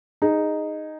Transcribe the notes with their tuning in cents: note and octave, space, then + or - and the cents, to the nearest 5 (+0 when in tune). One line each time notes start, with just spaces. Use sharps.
D#4 -5 G#4 -10